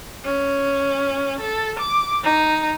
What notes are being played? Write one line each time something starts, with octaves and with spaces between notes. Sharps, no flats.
C#4
A4
D6
D#4